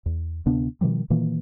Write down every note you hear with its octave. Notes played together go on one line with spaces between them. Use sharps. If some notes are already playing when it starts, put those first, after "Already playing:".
E2
D2 C3 B3 D4
B2 D#3 F3 G3
A#2 D#3 E3 A#3